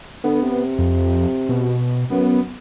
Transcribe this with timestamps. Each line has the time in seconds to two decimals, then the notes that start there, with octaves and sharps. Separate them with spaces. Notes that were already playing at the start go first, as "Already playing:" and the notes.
0.24 D3 B3
0.42 C3
0.79 F2
1.49 B2
2.10 F#2 B3